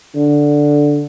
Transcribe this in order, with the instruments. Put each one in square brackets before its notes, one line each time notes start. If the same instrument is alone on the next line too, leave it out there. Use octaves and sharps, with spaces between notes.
[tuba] D3